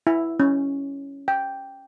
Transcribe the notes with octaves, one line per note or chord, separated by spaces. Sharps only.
E4
C#4
G5